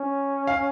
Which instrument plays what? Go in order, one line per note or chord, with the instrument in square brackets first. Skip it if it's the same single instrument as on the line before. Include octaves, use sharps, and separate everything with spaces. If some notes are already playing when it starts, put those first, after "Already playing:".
Already playing: [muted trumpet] C#4
[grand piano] F5